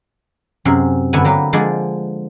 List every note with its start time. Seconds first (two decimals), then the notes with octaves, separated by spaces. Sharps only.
0.65 F#2 C3 G#4
1.13 G2 D3 B3 E4 G#5
1.24 F#3 A#3 G4 B4
1.53 D3 F3 G#3 G#4 D5